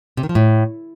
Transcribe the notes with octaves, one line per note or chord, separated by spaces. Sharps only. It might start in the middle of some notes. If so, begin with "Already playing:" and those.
C3
D#3
F3
A2